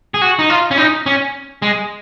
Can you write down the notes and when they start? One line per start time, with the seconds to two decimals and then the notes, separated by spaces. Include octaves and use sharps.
0.14 G#4
0.22 F#4
0.39 D#4
0.50 F4
0.71 C#4
0.78 D#4
1.06 C#4
1.62 G#3